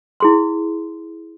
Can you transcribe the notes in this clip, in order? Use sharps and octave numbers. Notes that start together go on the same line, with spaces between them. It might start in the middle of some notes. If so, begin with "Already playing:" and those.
E4 G#4 C6